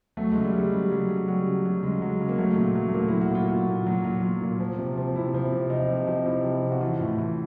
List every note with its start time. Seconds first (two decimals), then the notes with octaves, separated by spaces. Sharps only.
0.17 F#3 A3
0.31 G#3
0.36 C#3
0.45 G3
0.53 F#3 G#3
0.59 G3
0.72 C#3
0.92 F#3
1.09 C#3
1.28 F#3 G3
1.46 C#3
1.65 F#3
1.83 C#3 G#3
2.02 F#3
2.21 C#3
2.29 A#3
2.39 F#3 A3
2.58 A#2
2.75 F#3
2.88 A3
2.94 A#2 A#3
3.08 F#3 E4
3.21 F#4
3.30 A#2 F4
3.49 F#3 F#4
3.67 A#2
3.87 F#3
4.05 A#2 F4
4.23 F#3
4.42 A#2
4.60 F3
4.78 C3
4.97 F3
5.16 C3 E4
5.34 F3
5.52 C3
5.70 F3 D#4
5.88 C3
6.07 F3
6.26 C3 E4
6.45 F3
6.63 C3
6.72 F#4
6.81 E3 F4
7.00 A2
7.19 E3